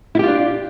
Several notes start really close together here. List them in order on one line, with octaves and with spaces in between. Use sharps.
E4 G4 F4 D4